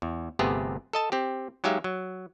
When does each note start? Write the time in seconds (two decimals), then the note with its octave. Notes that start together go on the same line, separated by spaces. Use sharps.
0.02 E2
0.39 G1 C3 A3 B3 G4 G#4
0.93 A4 D#5 A5
1.12 C4 G4
1.64 F#3 G#3 D#4 G4 E5 F5
1.84 F#3